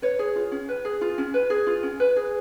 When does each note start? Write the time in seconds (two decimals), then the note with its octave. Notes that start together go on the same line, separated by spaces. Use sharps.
0.02 B4 C#5
0.19 G#4
0.36 F4
0.52 C#4
0.69 B4
0.85 G#4
1.01 F4
1.18 C#4
1.34 B4
1.50 G#4
1.67 F4
1.83 C#4
2.00 B4
2.16 G#4